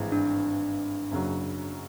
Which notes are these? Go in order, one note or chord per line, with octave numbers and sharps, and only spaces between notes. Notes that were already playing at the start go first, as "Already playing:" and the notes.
Already playing: G#1 G2 E3 G#3
D4
F#1 F#2 C#3 F#3